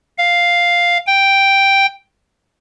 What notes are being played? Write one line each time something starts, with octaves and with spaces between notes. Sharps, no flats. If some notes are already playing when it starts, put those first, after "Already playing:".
F5
G5